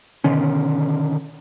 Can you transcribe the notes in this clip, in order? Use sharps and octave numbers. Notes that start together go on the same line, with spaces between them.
B2 D3 D#3 C#4